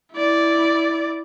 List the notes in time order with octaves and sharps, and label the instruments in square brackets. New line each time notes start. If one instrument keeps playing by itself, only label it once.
[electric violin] E4 D5